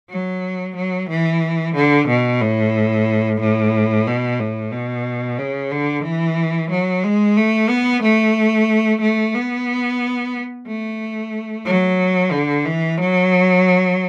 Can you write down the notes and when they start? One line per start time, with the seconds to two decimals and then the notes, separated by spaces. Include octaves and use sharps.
0.10 F#3
0.76 F#3
1.09 E3
1.75 D3
2.08 B2
2.41 A2
3.40 A2
4.07 B2
4.39 A2
4.72 B2
5.38 C#3
5.72 D3
6.04 E3
6.71 F#3
7.03 G#3
7.37 A3
7.69 B3
8.03 A3
9.01 A3
9.34 B3
10.67 A3
11.65 F#3
12.32 D3
12.65 E3
12.97 F#3